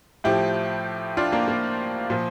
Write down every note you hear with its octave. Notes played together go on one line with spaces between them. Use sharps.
A2 F3 E4 G4
D4 F4
A#3 D4
A#3
A#2 F3